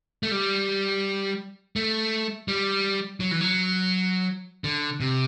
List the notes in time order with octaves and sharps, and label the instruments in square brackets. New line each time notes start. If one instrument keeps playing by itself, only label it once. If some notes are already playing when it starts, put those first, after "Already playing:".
[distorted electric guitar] A3
G3
A3
G3
F#3
E3
F#3
D3
C3